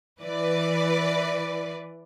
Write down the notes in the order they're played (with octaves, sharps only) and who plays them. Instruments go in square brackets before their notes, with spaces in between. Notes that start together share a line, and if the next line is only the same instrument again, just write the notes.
[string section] E3 B4 D5